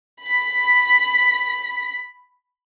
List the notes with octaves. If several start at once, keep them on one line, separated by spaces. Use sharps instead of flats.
B5 B6